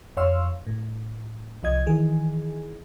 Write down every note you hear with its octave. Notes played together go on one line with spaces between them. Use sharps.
F2 C#5 F5 C6 E6
A2
C2 F3 D#5 G#6
D#3 E3 G#4